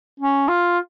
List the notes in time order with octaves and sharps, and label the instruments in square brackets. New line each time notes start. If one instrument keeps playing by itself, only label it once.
[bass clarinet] C#4
F4